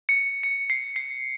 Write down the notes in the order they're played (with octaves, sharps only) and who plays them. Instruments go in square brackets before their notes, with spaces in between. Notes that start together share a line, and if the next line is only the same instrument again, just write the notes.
[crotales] C#7
C#7
C7
C7